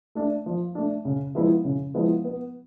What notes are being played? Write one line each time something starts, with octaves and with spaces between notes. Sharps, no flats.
A3 D4
F3
A3 D4
C#3
F3 G#3 B3 E4
C#3
F3 G#3 B3 E4
B3